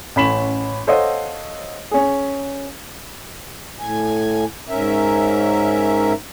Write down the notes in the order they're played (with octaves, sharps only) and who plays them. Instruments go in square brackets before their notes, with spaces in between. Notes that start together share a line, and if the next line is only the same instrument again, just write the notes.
[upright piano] A1 C#4 B5 B6 E7 F#7
A4 C5 C#5 D#5 F5 F#5
C#4 G#4
[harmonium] A2 G#5
G#2 C#4 A#4 E5